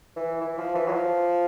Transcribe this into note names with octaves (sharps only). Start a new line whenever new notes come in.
E3
E3
F3
E3
F#3
F3